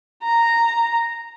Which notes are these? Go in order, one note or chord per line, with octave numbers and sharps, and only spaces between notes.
A#5